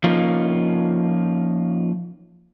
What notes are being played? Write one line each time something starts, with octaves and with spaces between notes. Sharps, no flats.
F3 A#3 C#4 D#4 F4